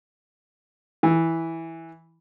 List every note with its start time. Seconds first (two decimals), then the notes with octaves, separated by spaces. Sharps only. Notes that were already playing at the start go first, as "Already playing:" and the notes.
1.03 E3